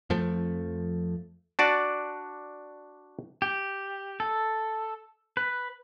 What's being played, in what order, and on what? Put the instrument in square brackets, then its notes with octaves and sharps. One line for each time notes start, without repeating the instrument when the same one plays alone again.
[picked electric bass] F2 F3 A3
[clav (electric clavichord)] D4 F#4 D5
[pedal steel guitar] G4
A4
B4